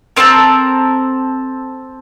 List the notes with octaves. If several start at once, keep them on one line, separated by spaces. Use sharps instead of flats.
C4 F4 A4 A#4